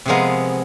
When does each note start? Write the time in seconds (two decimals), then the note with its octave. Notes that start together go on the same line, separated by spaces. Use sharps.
0.06 C3 F3 G#3 B3 G#4 A#4